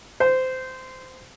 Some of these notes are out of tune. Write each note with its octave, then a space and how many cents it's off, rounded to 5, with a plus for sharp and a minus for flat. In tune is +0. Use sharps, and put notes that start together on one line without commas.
C5 -20